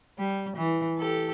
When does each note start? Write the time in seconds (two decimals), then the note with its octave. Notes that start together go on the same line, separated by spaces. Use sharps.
0.18 G3
0.56 E3
0.99 G4 A4